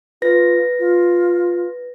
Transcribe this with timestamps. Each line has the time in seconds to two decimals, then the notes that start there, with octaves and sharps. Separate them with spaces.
0.22 F4 B4 A#6
0.79 F4